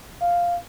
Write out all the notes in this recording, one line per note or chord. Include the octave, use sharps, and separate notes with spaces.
F5